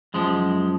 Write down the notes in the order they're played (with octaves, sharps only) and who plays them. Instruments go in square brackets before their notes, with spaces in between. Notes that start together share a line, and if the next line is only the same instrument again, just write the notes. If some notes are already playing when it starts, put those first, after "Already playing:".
[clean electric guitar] F#2 F3 G#3